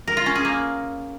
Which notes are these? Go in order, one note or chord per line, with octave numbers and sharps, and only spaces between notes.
A#4
F4
C#4
G#4
A#3